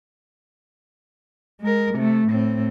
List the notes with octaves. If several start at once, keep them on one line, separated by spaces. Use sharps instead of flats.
G#3 A#4
C3 A3
A2 C4